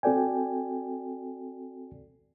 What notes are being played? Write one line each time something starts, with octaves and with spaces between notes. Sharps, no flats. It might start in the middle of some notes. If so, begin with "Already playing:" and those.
C4 F#4 A4 D5 G5 G#5